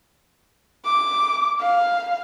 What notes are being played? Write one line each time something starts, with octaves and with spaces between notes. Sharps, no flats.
D6
F5